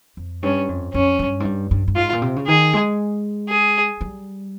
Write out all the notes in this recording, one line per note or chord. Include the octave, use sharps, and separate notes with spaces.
F2
G2 C#4
F2
F2 C#4
G2
G#2
G2
G2
G2
G#2 F4
A#2
C3
C#3
D#3 G#4
G#3
G#4
G3